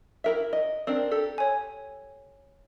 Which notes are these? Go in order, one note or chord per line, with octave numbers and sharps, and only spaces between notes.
E4 A#4 E5
D#5
C4 D4 A#4
G4 A4
C#5 G#5